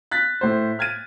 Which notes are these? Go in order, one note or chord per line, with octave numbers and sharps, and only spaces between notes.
F#6 A6 B6
A2 C5
F6 G#6 A6 D#7